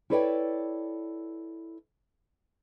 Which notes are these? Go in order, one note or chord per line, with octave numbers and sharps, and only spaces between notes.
E4 A4 B4 C#5 D5 G5